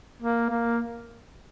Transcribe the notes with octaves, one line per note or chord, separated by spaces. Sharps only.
A#3
A#3